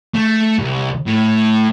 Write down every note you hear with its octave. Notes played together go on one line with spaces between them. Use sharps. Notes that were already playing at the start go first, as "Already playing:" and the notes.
A3
C2
A2